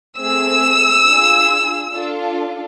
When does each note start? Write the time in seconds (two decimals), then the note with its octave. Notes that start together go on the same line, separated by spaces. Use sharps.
0.18 A3 C4 G#4 E6
1.05 D4 F4 G#4
1.91 D4 F4 A4